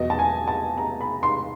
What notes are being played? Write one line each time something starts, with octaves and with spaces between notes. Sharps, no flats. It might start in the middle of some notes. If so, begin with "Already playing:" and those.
Already playing: E2 B2 F#3 D#5
A5
G#5
A5
A#5
B5
C6